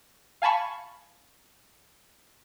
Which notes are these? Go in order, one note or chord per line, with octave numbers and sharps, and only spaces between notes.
F5 G#5 A5 B5 C#6